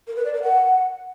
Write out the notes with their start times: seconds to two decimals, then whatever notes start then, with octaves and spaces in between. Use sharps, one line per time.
0.07 A#4
0.16 B4
0.25 D5
0.34 A#4
0.43 F#5